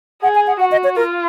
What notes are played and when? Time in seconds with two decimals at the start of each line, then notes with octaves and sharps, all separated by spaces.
0.23 G#4 F#5
0.35 G#5
0.47 F#5
0.60 F#4 F#5
0.72 D#5
0.84 C#5
0.96 F4 A#4